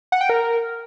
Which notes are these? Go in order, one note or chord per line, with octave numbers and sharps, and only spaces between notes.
F#5
G5
A#4